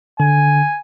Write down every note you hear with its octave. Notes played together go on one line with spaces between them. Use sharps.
D3 G#5